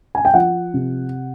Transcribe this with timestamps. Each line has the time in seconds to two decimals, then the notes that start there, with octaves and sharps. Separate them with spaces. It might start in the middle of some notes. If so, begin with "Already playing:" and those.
0.15 G#5
0.25 G5
0.34 F3 F#5
0.74 C3